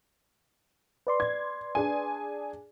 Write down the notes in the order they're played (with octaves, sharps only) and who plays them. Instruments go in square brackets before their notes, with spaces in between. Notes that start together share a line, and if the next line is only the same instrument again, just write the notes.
[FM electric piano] B4 D5 C6
[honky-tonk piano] G#6
D4 G#4 G#5